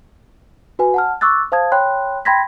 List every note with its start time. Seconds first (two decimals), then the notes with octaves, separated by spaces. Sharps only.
0.79 F#4 B4 G#5
0.94 F#5 A5 F6
1.21 C#6 D6 E6 F#6 A6
1.52 C5 F5 A5 D#6 G#6
1.72 C#5 G5 B5 C6 F#6
2.25 G5 B5 C6 G#6 A#6 B6